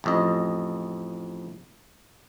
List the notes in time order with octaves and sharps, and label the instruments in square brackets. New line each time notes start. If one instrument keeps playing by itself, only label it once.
[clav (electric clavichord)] A1 F2 D#5